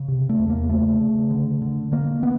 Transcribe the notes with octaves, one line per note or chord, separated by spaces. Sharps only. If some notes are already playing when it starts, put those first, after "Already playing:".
Already playing: C#3
C3
A3
E2
A#3
C#3 A3
C#3
D3
D3
D3 A#3
D3 B3